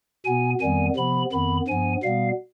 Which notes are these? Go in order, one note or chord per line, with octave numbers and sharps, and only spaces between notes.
B2 B3 G#5
F2 D#3 G3 B3 G#5
C3 F3 B3 B5
F2 D#3 B3 B5
G2 F3 B3 G#5
B2 G3 B3 F5